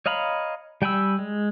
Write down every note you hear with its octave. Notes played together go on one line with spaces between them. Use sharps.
C#5 D#5 F5 A#5 B5
G3 G5 G#5 B5 E6
G#3